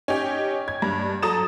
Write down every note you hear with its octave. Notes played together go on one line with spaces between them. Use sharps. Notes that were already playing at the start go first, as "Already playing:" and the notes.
C#4 D#4 G4
G#6
G2
F#3 A4 A#5 D#6 A6 E7